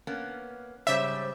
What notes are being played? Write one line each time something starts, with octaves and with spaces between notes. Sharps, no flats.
A#3 B3 C#4
G#2 C#3 G3 C5 C#5 E5 D6 G6